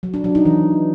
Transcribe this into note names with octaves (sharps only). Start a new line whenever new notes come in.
F#3
D4
F#3
D#4
E3